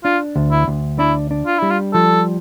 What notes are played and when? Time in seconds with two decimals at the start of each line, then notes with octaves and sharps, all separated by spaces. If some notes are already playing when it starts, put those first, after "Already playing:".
0.04 D4 F4
0.36 D2
0.51 E4
0.68 D2
0.99 D4 E4
1.31 D4
1.46 F4
1.59 G3 E4
1.71 F4
1.93 F3 A4